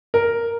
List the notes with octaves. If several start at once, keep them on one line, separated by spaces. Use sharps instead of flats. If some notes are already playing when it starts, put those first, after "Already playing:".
A#4